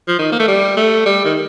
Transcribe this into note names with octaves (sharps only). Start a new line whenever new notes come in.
F3
D#3
A#3
A3
G3
A3
G3
D#3